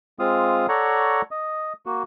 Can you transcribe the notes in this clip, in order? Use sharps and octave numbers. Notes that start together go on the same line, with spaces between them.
G#3 C4 F4 F5 D#6
A4 C#5 D5 F#5 A#5 C#6
D#5
A#3 F#4